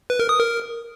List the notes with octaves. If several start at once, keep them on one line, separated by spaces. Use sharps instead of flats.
B4
A#4
D#6
A#4